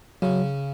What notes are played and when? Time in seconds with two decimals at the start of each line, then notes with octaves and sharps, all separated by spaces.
0.22 C#3 F#3